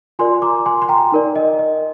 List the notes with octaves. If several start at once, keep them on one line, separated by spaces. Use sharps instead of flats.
F4 A#4 D5 G#5 C6
A#5 D6
G#5 C6
C6
G5 A#5
D#4 A#4 D5
D#5
D#5